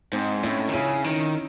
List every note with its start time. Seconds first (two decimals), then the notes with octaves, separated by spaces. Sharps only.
0.13 G#2 C4 D#4
0.43 A2 C#4 E4
0.68 D#3
0.74 C#3 C#4 E4
1.04 D#3